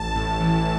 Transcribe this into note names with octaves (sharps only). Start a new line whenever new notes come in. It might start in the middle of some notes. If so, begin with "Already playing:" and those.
Already playing: A1 A5
A2
E3